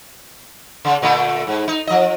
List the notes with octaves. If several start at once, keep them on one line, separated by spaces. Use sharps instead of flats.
C#3
A#2 D3 A3
G#2
D#4
F3 D#5